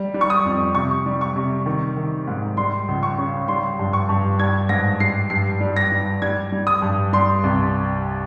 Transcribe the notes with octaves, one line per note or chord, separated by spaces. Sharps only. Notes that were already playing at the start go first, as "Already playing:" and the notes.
Already playing: G3
G3
C#6
D#6
F2
C3 C#6
G3
C#6
C3
D#3
D#3
G#2
G3 C6
C#2
C#6
C#3
G3 C6
G2
C#6
G2
G3 G#6
G#2 A#6
G3 C7
G2 C7
G3
A#6
G3
G3 G#6
G3
D#6
G2
G3 C6
C2